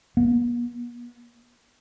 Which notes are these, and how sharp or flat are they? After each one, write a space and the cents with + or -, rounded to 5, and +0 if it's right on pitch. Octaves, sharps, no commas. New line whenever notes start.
B3 -45